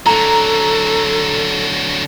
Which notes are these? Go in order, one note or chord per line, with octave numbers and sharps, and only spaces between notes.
D3 F#3 A4 A#5